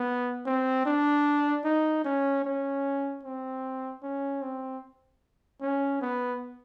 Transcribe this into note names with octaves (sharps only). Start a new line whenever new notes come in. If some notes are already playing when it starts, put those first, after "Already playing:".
Already playing: B3
C4
D4
D#4
C#4
C#4
C4
C#4
C4
C#4
B3